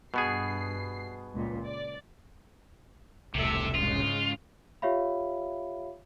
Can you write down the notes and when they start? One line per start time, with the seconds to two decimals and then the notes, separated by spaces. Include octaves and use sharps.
0.14 G2 B2 B3 G#4 C7
1.34 C#2 A#2
1.66 D5
3.35 E1 C2 A2 C3 A4 E5
3.75 G#2 C#3 G#3 F4
4.82 F4 G4 C#5 E5 F5 B5